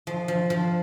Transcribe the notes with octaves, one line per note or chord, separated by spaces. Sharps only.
F3
F3
F3